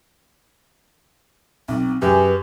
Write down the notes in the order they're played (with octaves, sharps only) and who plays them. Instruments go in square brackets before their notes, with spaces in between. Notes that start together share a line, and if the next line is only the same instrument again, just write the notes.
[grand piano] B1 [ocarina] C4
[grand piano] F#2 G4 G#4 [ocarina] B4